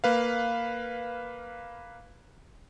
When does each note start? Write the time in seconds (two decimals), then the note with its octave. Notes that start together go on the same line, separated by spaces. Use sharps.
0.04 A#3 B4 F5